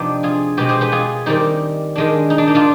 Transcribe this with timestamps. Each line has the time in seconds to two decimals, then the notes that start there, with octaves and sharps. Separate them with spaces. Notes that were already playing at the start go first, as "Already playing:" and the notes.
Already playing: C3 F3 B3 D4 D#4 G4
0.23 F4 G#4
0.57 B2 G#3 C4 G4 B4
0.69 G#4 C5
0.81 G4 B4
0.92 F4 G#4
1.26 D#3 G3 C4 D#4 G4
1.96 D#3 G#3 D4
2.30 D#4
2.38 D4
2.48 D#4
2.55 D4 F4